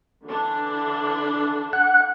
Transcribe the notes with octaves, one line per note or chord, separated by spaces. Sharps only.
D3 E3 D4
F#5